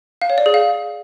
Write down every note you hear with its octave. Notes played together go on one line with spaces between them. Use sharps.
F5
C#5
D5
G#4
F5